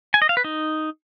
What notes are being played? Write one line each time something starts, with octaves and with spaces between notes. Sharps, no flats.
G#5
D#5
F5
B4
D#4